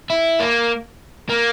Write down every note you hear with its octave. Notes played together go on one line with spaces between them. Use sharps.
E4
A#3
A#3